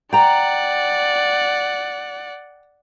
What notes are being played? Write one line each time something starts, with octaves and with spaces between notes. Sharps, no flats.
D5 F#5 G5 A#5